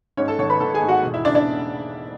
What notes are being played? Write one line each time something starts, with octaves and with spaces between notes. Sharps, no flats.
G#2 C#4 C#5
A4 A5
G#1 C#5 C#6
B4 B5
G#1 A4 A5
G#4 G#5
G#2
F#4 F#5
E1
E4 E5
C#3 D4 D5
D4 D5